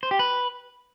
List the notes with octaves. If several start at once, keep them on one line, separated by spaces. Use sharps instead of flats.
C5
G4
B4